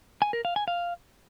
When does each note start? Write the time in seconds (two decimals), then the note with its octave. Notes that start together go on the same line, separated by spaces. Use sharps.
0.22 G#5
0.33 A#4
0.45 F5
0.56 G#5
0.68 F5